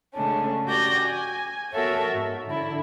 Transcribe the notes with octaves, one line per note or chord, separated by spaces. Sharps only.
C#3 G#3 A3 C#4 D4
F#4 G4 D5 G6 A#6
G#5
B3 F#4 A4 A#4 C#5 E5
G#2
D3 E4